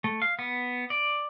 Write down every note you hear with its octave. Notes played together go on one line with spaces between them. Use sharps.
A3
F5
B3
D5